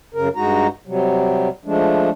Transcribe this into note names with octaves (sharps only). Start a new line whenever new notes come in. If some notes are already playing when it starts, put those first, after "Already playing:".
F#2 C#3 A#4
G2 G#3 D#4 F#4 A#5
C3 F#3 G3
F3 G#3 A3 D4